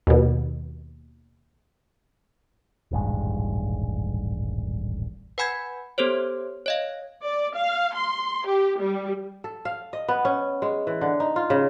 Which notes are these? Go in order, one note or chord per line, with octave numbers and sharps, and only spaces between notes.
D#2 B2
D#1 A1 G2 G#3
B4 F#5 G#5 B5 G6 G#6
B3 G4 A4 C5 C#5
C#5 D#5 F5
D5
F5
C6
G4
G3
A4
F5
D#5
B3
C#4
G#3
E3
D3
D#4
F4
C#3